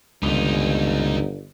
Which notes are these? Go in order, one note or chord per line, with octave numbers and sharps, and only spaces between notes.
G1 C#2 D#3 D#4 G4